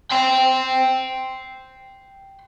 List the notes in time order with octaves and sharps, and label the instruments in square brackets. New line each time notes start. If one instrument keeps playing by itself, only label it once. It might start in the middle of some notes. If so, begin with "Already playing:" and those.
[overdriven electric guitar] G5 C6